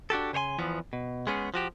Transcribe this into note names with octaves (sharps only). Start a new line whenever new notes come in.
D4 F#4 G4 A4
C#3 C5 C#5 G#5 C6
E2 E3 F3 B3
B2
G#3 B3 C#4 G#4
F3 F#4 G4